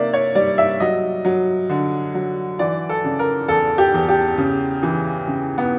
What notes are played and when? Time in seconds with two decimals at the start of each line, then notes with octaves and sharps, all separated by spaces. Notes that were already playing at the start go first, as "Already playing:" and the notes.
Already playing: C3 A#3 D5 E5
0.13 C#5
0.35 G3 D5
0.58 E5
0.80 F#3 D#5
1.25 F#3
1.70 D3
2.14 F#3
2.59 E3 D5
2.89 A4
3.04 C#3
3.19 A#4
3.48 E2 A4
3.78 G4
3.94 E2
4.09 G4
4.38 C#3
4.83 E3
5.28 C#3
5.58 B3